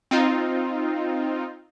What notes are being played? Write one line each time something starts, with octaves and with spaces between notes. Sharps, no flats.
C4 D#4 F4